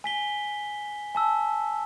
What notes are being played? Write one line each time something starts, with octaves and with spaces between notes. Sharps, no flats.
G#5 B6 G7
G#5 A5 E6